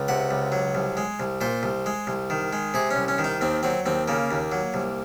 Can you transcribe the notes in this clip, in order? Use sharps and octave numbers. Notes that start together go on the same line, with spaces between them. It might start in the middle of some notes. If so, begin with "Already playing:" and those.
Already playing: C#2
C3 F#5
C#2
F#3
C2
G#3
C2
A#2 C5
C2
G#3
C2
D#3
G#3
C3 G#4
C#4
C2
C#4
D#3
D#4
D#2 C4
F#3 C4
D#2 C4
C#3 A#3
D#2
F#3
C2